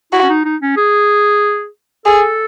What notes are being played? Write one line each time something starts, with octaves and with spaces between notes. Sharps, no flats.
E4 F#4
C#4
D#4
D#4
C#4
G#4
G#4 A4